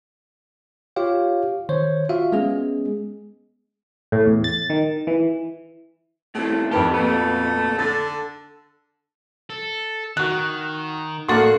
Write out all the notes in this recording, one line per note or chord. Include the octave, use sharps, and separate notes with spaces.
F4 G4 C#5 F5
D#3 C5 C#5
F4 F#4 E5 F5
G#3 B3 C#4 G#4
A2
E2
A6
D#3
E3
A2 C3 E3 A3
F2 D#3 G4 B4 A5
A#2 A3 B3
D3 A4 A6
A4
D#3 F#4 F#6
A2 A#3 D4 F#4 A4 C6